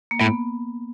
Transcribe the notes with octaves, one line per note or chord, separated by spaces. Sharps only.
A#3
A2 B3